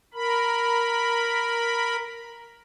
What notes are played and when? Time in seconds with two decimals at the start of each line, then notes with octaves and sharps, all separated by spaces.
0.14 A#4 B5